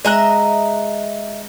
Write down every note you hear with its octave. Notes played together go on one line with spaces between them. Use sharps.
G#3 D#5 E5 A#5 F#6